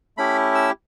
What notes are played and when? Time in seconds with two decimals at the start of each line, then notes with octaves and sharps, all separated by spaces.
0.17 A3 C#4 E4 G4 B5
0.55 E6